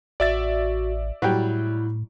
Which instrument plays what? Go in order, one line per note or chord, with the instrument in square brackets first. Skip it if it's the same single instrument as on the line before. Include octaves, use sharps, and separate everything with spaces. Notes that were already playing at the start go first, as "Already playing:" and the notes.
[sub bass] A1 [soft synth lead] F#4 [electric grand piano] D5 E5 A6
[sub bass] A2 [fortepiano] F#3 G3 G5 [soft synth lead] E4